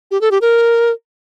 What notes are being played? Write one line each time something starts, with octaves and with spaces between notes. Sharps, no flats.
G4
A4
G4
A#4